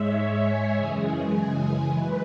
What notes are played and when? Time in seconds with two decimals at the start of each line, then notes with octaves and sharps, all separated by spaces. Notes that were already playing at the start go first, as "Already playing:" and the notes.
Already playing: G#2 G#3 C#5 E5
0.18 C#5
0.47 G#4
0.75 F#2 C#3 E3 G#3
1.88 F#2 E3 G#3 B4